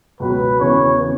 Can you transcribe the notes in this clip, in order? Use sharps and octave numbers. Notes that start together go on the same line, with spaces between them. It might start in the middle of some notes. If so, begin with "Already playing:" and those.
C#2 B2 F#3 B4
E2 C#3 E3 C#5
C#3 E3